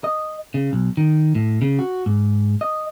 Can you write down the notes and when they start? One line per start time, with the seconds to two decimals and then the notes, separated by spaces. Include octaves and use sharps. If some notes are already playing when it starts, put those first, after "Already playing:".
0.04 D#5
0.54 C#3
0.73 B1
0.97 D#3
1.35 A2
1.62 C#3
1.79 F#4
2.06 G#2
2.61 D#5